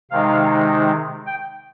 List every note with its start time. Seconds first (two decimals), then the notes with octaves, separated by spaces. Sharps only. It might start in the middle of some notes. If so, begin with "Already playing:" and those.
0.11 C3 D#3 G#3 D#4 F5
1.26 G5